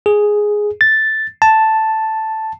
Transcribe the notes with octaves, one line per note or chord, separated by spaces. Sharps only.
G#4
A6
A5